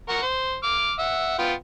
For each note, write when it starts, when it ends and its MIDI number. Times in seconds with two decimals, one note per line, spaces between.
0.09 0.21 70
0.09 0.21 78
0.09 0.21 85
0.22 0.56 72
0.63 0.93 86
0.63 0.93 89
0.99 1.35 76
0.99 1.35 78
1.39 1.53 59
1.39 1.53 65
1.39 1.53 79